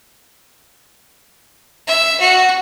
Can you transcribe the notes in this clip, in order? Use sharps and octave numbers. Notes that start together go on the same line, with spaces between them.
E5
F#4